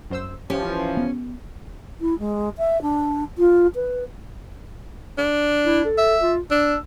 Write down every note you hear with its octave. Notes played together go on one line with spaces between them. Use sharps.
F#2 C5 E6
E3 F3 C#4 G4
B3
E4
G#3
E5
D4
F4
B4
D4
E4
A4
E5
F4
D4 E6